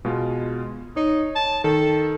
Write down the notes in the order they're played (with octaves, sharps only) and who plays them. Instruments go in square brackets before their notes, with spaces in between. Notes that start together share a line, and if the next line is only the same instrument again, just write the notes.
[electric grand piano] B2 G#3 F4
[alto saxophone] D#4 [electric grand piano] C#5
[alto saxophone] A5
[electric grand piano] D#3 [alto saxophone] A4